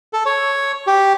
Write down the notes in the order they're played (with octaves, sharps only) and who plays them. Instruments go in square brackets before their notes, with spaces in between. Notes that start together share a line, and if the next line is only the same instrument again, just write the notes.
[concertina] A4
C#5
G4